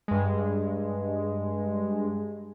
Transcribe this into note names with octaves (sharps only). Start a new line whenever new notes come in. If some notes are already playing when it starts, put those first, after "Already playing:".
G2 G#3